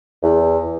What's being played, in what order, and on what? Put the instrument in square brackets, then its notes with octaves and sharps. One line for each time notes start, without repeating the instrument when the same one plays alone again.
[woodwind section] E2